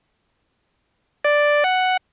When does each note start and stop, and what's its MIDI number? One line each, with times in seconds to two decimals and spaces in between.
1.24 1.64 74
1.64 1.97 78